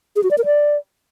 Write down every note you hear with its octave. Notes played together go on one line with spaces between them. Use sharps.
G#4
F#4
D5
A#4
D5